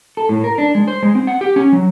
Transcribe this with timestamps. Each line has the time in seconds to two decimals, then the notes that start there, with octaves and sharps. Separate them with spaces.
0.17 A4
0.29 A2
0.44 A#4
0.58 D4
0.75 G#3
0.88 C5
1.03 G#3
1.15 C4
1.27 F#5
1.41 G4
1.56 C#4
1.73 F#3